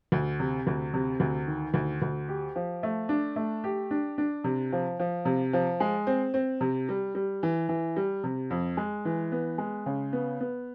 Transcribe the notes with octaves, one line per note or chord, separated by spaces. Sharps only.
D2
C3
D2
C3
D2
D#3
D2
D2
G4
F3
A3
D4
A3
G4
D4
D4
C3
F3
F3
C3
F3
G#3
C4
C4
C3
G3
G3
E3
E3
G3
C3
F2
G#3
E3
B3
G#3
C#3
B3
B3